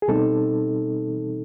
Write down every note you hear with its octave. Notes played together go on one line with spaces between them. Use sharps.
G#4
B2 G3 C4 D#4 A4